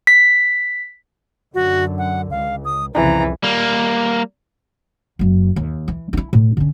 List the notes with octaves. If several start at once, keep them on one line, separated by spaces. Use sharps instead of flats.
B6
F#2 D3 F#4
F#5
C#2 F5
D#6
C2 F2 C#3 E3 A#5
G3 A#3
F#1 F#2
D#2
E3
D#4 E4
A2
D3 C#4